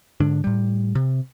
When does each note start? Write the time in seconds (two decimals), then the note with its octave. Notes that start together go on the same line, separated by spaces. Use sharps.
0.20 G#2 D3 D4
0.44 A2 G3
0.95 C3